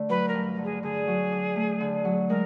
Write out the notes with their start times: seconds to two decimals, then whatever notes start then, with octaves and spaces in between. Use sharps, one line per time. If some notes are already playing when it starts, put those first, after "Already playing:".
Already playing: D3 A3
0.09 F#3 B4
0.28 A#4
0.34 G2
0.58 D3
0.64 G#4
0.83 D3 G#4
1.07 F#3
1.32 D4
1.56 A3
1.81 D3
2.05 F#3
2.29 G#3 A#4